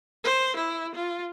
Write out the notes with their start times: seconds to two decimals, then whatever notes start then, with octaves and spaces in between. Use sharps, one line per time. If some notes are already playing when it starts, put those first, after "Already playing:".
0.24 C5
0.56 E4
0.95 F4